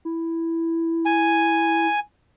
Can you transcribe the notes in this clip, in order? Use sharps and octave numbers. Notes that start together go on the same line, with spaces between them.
E4
G#5